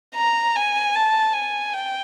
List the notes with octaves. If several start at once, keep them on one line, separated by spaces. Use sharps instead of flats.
A#5
G#5
A5
G#5
G5